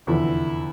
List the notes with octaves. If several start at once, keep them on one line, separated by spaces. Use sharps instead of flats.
F1 E2 D3 F3 E4